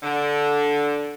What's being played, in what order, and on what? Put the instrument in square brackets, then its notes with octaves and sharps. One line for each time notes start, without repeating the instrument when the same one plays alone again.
[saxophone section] D3